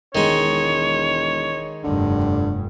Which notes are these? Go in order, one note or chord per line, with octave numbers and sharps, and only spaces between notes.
E1 D#3 G#3 C#5
F1 G2 D3